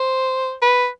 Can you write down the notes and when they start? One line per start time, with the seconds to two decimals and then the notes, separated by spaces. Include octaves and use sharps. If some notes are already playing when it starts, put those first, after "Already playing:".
Already playing: C5
0.62 B4